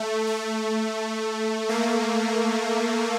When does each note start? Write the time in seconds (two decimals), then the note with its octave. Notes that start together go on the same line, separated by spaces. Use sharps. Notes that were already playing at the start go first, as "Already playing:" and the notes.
Already playing: A3
0.27 A3
1.69 A#3